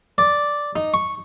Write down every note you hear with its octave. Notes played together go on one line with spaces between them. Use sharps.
D5
D#4
C#6